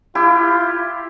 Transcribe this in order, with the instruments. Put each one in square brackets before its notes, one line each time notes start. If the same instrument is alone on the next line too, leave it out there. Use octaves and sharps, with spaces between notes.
[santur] E4 G4 [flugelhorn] F4